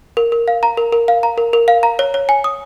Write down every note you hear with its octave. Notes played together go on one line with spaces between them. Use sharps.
A#4
A#4
F5
A#5
A#4
A#4
F5
A#5
A#4
A#4
F5
A#5
C#5
C#5
G#5
D#6